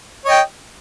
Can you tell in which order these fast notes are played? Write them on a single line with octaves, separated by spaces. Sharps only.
C#5 D#5 G5